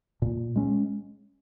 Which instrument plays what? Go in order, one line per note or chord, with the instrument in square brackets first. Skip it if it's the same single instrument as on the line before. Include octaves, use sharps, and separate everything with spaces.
[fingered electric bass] A#2
G#3 C#4